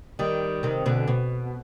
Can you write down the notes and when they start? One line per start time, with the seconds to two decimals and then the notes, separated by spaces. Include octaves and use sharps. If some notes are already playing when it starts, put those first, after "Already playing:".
0.19 D#3 G3
0.63 C3 D#3
0.86 B2 D3
1.08 B2